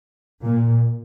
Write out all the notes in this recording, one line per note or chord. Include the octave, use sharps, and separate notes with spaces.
A#2